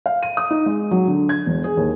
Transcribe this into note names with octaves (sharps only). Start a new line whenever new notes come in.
F5
D#7
D#6
D#4
G#3
F#3
D3
G#6
E1
G#4
D#2